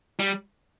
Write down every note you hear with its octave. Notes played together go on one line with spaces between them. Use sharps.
G3